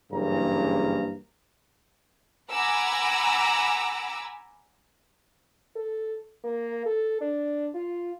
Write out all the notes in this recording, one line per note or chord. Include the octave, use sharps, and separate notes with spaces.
F#1 G2 C#3 E3 A#3 A#5
F#5 G#5 A#5 B5 D6 E6
A4
A#3
A4
D4
F4